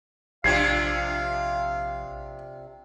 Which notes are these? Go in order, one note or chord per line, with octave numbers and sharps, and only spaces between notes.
A#1 C3 D4 F4 F5 G#6 C7